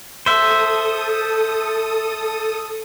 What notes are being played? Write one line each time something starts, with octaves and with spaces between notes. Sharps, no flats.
A4 C5 E5 D#6